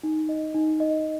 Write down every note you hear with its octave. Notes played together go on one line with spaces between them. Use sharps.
D#4
D#5
D#4
D#5